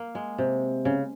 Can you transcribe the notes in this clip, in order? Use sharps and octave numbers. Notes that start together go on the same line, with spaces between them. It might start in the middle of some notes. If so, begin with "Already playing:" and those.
Already playing: A#3
G#3
C3
C#3